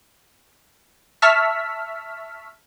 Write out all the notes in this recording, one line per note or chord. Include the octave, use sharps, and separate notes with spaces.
E5 A5 C#6 E6 F6 B6